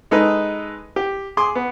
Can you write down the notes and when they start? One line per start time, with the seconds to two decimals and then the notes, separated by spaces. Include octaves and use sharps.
0.11 G#3 D#4 A4 B4
0.96 G4
1.37 G#4 C6 D6
1.55 B3